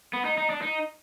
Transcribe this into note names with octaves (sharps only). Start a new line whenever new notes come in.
B3
D#4
D#4
D4
D#4